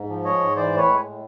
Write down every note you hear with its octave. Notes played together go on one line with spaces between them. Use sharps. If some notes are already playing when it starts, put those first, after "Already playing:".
Already playing: G#2
F3
G#3 C#5 D#5
G#2
E3 C5 D5
A2
B4 C#5
G#3
A2